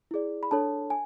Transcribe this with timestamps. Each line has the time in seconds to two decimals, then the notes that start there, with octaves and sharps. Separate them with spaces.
0.11 E4 G#4 D5
0.43 B5
0.51 D4 A4 C#5 A5
0.90 G#5